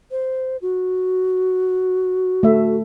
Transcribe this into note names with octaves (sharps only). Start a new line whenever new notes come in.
C5
F#4
A3 E5